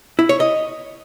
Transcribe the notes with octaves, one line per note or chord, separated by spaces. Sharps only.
E4
C#5
D#5